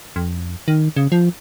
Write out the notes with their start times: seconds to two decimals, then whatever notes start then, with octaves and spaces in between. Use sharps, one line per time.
0.16 F2
0.68 D#3
0.96 C#3
1.12 F3